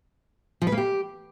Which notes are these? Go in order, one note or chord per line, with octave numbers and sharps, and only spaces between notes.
F3
B4
A#3
G4